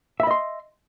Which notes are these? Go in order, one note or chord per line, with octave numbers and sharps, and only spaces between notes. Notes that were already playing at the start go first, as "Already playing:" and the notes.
D#5 E5 B5 C6